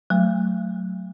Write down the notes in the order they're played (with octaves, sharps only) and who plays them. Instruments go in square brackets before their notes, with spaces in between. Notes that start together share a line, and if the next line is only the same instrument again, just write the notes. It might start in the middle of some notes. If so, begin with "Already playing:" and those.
[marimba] F#3 A3